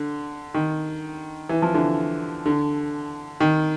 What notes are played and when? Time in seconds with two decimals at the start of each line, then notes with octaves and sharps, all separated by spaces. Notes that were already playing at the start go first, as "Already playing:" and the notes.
Already playing: D3
0.54 D#3
1.49 E3
1.62 F3
1.74 D3 E3
2.46 D3
3.40 D#3